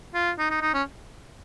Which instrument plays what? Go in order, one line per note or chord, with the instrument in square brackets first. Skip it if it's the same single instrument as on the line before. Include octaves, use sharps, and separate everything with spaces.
[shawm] F4
D#4
D#4
D#4
C#4